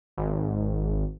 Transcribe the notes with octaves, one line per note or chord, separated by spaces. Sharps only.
G#1